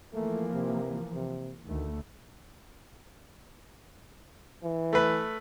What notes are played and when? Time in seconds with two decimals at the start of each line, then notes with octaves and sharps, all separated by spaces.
0.14 E3 F3 A3 A#3
0.53 C3
1.14 C3
1.67 D2 D#3 A3
4.63 E3
4.93 A3 B4